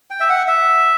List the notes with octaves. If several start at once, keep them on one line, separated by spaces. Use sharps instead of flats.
G5
E5
F#5
E5